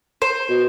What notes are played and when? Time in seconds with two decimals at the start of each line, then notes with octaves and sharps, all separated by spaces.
0.22 C5
0.50 B2